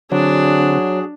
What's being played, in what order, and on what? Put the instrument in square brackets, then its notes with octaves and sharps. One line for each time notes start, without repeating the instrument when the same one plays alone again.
[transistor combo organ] D3 C4 [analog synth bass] F#3 [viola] D4 [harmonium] F#4 G#4